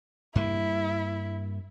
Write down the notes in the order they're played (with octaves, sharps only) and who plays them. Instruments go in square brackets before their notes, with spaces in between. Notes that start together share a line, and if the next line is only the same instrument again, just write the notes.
[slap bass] G2 A#3 [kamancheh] E4